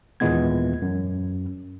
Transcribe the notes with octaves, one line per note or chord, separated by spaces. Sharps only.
D#2 A#2 E3 G#3 B3 G#6
F#2